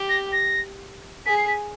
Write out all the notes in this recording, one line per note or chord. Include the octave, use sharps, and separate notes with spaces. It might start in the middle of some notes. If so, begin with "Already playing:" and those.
Already playing: G4
A#6
A#6
G#4 B6
C7
B6